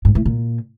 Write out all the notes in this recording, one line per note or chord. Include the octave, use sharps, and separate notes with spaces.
G#2
A2
A#2